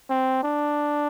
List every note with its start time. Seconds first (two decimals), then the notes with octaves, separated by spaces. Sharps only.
0.10 C4
0.44 D4